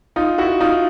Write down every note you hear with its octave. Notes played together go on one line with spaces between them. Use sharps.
D#4 F4
E4 F#4
D#4 F4